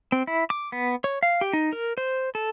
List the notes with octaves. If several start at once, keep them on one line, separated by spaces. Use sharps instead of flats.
C4
E4
D6
B3
C#5
F5
G4
D#4
A#4
C5
A4